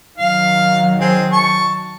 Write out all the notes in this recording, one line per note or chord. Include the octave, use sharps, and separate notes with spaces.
D#3 F#3 F5
C4 G#4
A5 C#6